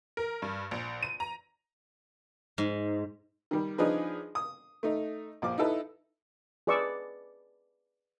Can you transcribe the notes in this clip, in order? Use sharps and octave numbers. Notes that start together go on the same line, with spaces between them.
A#4
G2
A#1
D#7
A#5
G#2
D#3 G3
F3 D4 D#4 G#4 B4
D#6
A3 D#4
A#1 F3 D6
D#4 E4 A4 B4
G#4 B4 D5 C#6 D6 E6